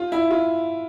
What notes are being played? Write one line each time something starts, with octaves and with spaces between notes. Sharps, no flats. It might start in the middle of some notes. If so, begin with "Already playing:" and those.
Already playing: F4
E4
F4